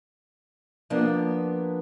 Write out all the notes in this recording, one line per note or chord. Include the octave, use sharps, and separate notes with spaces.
F3 A#3 B3 D4